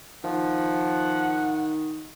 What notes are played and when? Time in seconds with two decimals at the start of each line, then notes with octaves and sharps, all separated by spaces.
0.24 D#3 F3 F#5